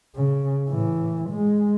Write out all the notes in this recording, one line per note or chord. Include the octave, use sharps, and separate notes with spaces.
C#3
A2 E3
G#3